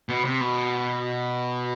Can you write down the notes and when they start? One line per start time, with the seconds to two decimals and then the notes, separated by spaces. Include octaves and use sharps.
0.09 B2
0.25 C3
0.41 B2